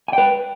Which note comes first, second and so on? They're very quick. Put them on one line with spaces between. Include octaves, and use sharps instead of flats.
G#5 G5 B4